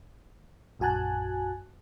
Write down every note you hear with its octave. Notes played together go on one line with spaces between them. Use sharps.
A#1 F#2 F#4 G#5 A5 F#6